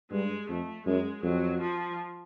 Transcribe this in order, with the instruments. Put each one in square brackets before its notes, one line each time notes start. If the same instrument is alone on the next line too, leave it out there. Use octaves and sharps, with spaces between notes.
[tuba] G2 [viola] G#3
[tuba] F2 [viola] A3
[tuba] F#2 [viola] G#3
[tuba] F2 [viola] F#3
[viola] F3